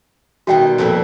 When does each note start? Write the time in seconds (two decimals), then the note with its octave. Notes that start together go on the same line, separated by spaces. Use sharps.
0.47 B2 D#3 G3 F#4 E5 G5
0.78 F2 A#2 E4